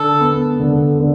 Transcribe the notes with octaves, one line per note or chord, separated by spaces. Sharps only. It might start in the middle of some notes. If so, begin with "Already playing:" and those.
Already playing: D3 A4
B3
D3
D3